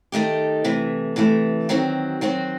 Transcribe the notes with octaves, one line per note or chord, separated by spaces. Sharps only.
D#3 A3 D#4 G4
C3 E3 A3
C3 E3 A3
D#3 F#3 C4 F#4
D#3 F#3 C4 F#4